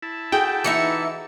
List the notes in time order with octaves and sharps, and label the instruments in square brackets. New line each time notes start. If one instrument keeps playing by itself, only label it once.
[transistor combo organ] E4 A5
[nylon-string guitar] F#4 G#4 A4 [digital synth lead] G5
[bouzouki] E3 D#4 E5 [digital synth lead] C#7